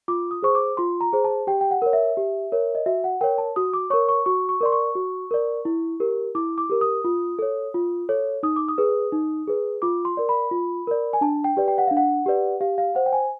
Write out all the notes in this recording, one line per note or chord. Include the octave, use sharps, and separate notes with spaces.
F4 D6
D#6
G#4 C5 C#6
D6
F4 C6
A#5
G#4 C5
A5
G4 G5
G5
F#5
A#4 C#5
E5
G4
A#4 C#5
D#5
F#4 E5
F#5
A#4 C#5 G5
A5
F#4 D#6
D6
A#4 C#5 C#6
C#6
F#4 C#6
C#6
A#4 D5 C6
C#6
F#4
A#4 D5
E4
G4 A#4
E4 D6
D6
G4 A#4
D#6
F4
A4 C#5
F4
A4 C#5
D#4 D#6
D6
D#6
G#4 B4
D#4
G#4 B4
F4 D6
C6
A#4 D5
B5
F4
A#4 D5
G#5
D4 A5
G5
G4 B4 D5
G5
F#5
D4 F5
F#5
G4 B4 D5
G4 F5
F5
C5 F#5
G5
G#5